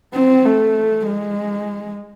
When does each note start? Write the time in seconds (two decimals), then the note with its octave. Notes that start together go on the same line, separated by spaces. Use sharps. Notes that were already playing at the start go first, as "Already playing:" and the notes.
0.14 C4
0.45 A3
1.06 G#3